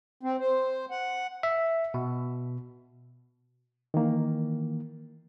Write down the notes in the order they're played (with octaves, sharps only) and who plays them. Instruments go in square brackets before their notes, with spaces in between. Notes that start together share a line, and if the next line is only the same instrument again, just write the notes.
[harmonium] C4
C5
F#5
[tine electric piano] E5
B2
[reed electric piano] D#3 E3 A#3